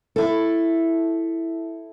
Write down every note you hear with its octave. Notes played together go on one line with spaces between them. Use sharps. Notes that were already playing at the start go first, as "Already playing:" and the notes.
E4 A4